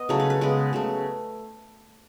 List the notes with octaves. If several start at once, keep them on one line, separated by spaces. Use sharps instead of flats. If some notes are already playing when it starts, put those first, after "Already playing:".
Already playing: B3 D#5
C#3 F#3 A3 C#5
B4
B4
C#3 G#3 B3
C#3 F#3 A3